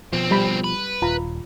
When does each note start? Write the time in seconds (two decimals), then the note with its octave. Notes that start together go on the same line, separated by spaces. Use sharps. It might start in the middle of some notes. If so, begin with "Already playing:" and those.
0.13 D2 B2 F3 C4
0.31 G3 B5
0.64 B4
1.02 D#1 F4 A#5 B5